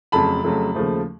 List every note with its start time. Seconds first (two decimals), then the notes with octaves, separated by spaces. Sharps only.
0.12 F2 C#3 F#3 A3 A5 B5
0.44 F2 C#3 F#3 A3
0.75 D#2 C#3 F3 A3